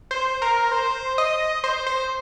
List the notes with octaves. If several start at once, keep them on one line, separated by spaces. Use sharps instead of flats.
C5
A#4
C5
D#5
C5
C5